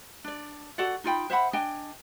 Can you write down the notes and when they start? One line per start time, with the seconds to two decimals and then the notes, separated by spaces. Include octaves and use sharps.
0.24 D4 D5
0.78 F#4 A4 D5 F#5
1.04 D#4 F4 G5 B5
1.30 C5 E5 F#5 B5
1.53 D4 D#5 G5 G#5